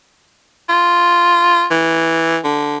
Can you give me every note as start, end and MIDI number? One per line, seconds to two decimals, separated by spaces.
0.69 1.66 65
1.71 2.39 52
2.44 2.78 50